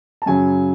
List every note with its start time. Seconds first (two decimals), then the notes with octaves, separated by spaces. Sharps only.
0.22 A5
0.26 F#2 C#3 F#3 G#5